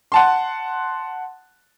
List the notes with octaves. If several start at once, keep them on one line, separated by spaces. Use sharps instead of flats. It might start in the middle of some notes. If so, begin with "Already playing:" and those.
F#5 A5 C6